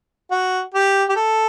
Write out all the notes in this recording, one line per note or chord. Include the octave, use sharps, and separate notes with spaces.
F#4
G4
G4
A4